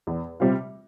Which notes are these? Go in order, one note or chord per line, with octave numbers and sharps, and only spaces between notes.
E2
C3 G3 C4 F4